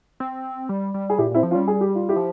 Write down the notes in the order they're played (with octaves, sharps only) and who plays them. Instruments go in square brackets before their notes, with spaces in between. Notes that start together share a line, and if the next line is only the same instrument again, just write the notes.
[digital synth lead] C4
G3
G3
[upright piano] G#4
[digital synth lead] A#2 [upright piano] E4 G4
[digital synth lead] A#2 [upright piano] C4 E4
[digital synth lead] F3
[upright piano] C#4 F4
[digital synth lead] G3
[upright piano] G#4
G4
F4
E4 G4
[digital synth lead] F3